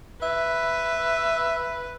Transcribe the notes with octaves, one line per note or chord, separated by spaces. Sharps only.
B4 E5